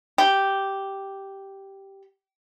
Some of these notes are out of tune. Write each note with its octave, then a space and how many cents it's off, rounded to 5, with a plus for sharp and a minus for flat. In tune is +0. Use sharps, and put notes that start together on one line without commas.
G4 -5